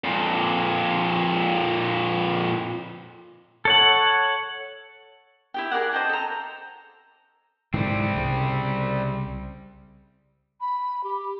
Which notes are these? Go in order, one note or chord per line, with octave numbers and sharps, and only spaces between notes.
F2 A#2
A4 C#5 F#5
E4 G4 G5
G#4 A#4 D5 F#5
C5 D#5 G5 A5
A4 A#5
G#2 D3 E3 G3 C4
C2 C#3
B5
G4